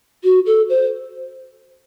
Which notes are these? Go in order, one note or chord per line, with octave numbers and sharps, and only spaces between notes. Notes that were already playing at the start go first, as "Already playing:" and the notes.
F#4
A4
C5